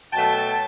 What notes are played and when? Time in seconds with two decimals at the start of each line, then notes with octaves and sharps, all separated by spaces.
0.12 B2 F#3 A3 G5 A5